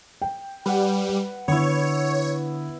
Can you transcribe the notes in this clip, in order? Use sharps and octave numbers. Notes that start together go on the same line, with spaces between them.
G5
G3 B4 F#5
D3 B3 E4 C#5